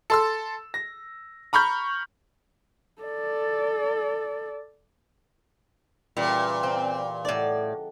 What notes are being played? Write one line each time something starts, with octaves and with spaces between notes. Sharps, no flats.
A4 C6 E6
A#6
A#5 B5 C#6 F6 G6
A4 D5
A#2 C#3 E3 G3
C4
A2 A4 D5 D#5 F#5